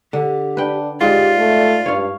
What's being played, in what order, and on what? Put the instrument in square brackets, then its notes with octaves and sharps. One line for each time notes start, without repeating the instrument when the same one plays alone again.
[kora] D3 [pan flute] G4
[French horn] D4 [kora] B4 G5
[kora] G#2 [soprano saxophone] F4 [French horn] G4 [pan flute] D5
[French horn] A3
[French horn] G2 [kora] C#5 F5